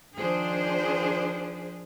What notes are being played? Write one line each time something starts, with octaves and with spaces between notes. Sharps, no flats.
D#3 F3 D4 G#4 C5